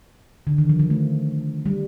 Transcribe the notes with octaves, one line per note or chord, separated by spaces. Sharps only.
D3
D#3
F3
F3
A3
G3